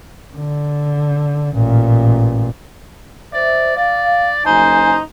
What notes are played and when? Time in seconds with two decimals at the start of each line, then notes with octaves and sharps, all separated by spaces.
0.36 D3
1.53 A1 A#2
3.33 C5 D5 E5
3.77 D5 F5
4.46 F#1 D#4 C5 G#5